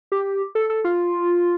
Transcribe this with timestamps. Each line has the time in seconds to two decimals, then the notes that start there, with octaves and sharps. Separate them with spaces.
0.12 G4
0.55 A4
0.70 A4
0.84 F4